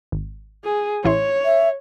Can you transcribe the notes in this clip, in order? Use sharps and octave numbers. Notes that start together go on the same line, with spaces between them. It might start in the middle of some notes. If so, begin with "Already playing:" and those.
G#1
G#4
A1 E4 C#5 C6
E5